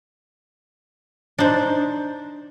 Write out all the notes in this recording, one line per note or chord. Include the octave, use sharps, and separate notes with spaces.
D4 D#4 C5